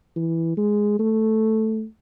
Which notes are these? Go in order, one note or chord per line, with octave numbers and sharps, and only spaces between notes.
E3
G#3
A3